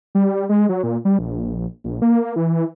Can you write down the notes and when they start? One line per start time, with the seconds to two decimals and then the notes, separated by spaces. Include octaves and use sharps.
0.15 G3
0.49 G#3
0.69 F#3
0.83 A#2
1.05 G3
1.19 A#1
1.84 A#1
2.02 A#3
2.36 E3